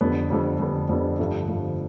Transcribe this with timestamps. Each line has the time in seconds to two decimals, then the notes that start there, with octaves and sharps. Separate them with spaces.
0.01 F2 D3 G3 B3
0.30 F2 D3 G3 B3
0.59 F2 D3 G3 B3
0.89 F2 D3 G3 B3
1.19 G1 G2 D3 F3 A3
1.48 G1 G2 D3 F3 A3